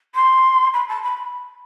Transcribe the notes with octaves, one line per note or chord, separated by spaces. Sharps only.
C6
B5
A5
B5